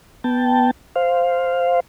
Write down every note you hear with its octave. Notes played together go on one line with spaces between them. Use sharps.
B3 G5 A5
C5 F5